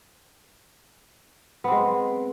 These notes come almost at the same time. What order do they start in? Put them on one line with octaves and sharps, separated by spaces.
B3 C4 G#3